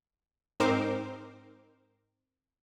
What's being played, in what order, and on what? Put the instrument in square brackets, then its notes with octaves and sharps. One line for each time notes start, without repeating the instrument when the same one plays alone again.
[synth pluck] G#2 C4 D#4 A#4 C5 D6